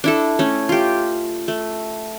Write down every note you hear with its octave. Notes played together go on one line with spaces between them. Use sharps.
D4 E4 A4
A3 C#4
F4 G4
A3